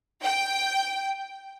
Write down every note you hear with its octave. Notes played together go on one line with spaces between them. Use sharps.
G5